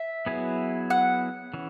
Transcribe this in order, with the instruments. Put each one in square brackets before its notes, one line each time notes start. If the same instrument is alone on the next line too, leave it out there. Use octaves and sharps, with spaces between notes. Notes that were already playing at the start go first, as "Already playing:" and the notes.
Already playing: [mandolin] E5
[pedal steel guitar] F#3 B3 E4 G#4 B4
[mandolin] F#5
[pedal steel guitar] E3 C#4